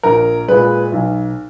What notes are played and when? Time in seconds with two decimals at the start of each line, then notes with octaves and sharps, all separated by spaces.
0.03 A#1 A#4
0.48 A#2 G#3 B4
0.92 B1